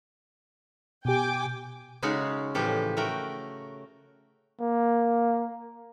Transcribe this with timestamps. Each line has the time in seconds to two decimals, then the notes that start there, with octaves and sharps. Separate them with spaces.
1.05 B2 G4 G5 G#5 D6
2.02 C#3 G#3 C#4 D#4 F#4
2.55 A2 E3 F3 G4 A4
2.97 A3 F#4 A#4 G5
4.61 A#3